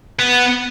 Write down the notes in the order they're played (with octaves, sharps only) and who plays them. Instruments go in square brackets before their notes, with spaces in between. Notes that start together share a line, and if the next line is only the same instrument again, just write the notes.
[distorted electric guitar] B3